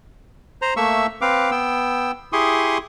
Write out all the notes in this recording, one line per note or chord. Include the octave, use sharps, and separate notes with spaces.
C5 A#5
A3 A#3 E5 C#6 E6
C4 B4 F5 D6
B3 G5 E6
E4 G4 G#4 C6 C#6 D#6